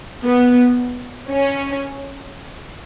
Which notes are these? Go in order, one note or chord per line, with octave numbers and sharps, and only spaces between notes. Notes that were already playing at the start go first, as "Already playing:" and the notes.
B3
C#4